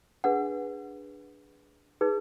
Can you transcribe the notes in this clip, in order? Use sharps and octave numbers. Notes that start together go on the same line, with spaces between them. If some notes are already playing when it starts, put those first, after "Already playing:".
D4 G#4 B4 F#5
D#4 G#4 B4